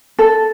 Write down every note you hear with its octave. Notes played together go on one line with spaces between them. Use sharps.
A4